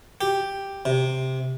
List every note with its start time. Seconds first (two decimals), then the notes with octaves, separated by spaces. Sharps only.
0.21 G4
0.85 C3